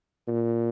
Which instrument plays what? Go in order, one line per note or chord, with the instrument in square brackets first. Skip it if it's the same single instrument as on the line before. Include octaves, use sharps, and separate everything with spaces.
[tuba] A#2